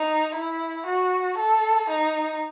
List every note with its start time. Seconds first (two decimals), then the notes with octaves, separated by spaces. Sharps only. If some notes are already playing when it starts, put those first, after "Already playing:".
Already playing: D#4
0.35 E4
0.86 F#4
1.38 A4
1.90 D#4